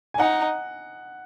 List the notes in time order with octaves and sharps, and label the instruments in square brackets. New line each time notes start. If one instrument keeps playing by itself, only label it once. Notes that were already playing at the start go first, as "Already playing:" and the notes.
[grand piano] G#5
[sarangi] D#4 [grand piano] F#5